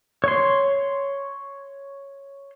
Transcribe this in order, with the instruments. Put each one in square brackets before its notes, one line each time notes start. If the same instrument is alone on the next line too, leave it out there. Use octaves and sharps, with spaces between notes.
[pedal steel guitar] C#5 C6